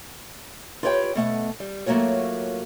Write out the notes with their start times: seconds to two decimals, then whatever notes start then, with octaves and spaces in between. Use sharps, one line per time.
0.83 F4 G4 B4 C#5 D#5 G5
1.15 B2 A3 F#5
1.60 G3
1.86 F#3 A3 A#3 F4 F#4 C#5